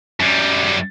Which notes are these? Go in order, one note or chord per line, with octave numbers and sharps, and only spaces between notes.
F#2 G3